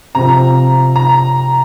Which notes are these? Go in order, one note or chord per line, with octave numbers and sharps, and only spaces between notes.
C3 F3 A#5
A#5